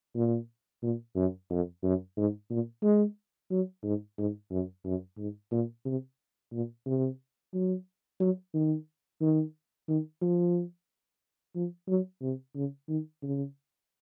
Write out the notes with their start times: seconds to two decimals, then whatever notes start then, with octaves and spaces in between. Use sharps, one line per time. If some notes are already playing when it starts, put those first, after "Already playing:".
0.16 A#2
0.83 A#2
1.16 F#2
1.50 F2
1.84 F#2
2.17 G#2
2.50 A#2
2.83 G#3
3.51 F#3
3.84 G#2
4.18 G#2
4.51 F#2
4.85 F#2
5.18 G#2
5.52 A#2
5.86 C3
6.52 A#2
6.86 C3
7.53 F#3
8.20 F#3
8.54 D#3
9.21 D#3
9.88 D#3
10.22 F3
11.56 F3
11.88 F#3
12.22 C3
12.56 C#3
12.89 D#3
13.23 C#3